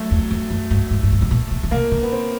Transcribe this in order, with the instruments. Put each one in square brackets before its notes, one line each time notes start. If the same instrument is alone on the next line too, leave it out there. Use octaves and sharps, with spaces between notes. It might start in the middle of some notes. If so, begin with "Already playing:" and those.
Already playing: [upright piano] F#3 A3
[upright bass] E2
F2
F#2
G2
G#2
G2
G#2
A2
A#2
B2
C#3
[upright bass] C3 [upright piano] A#3
[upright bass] C#3
[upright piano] B3
C4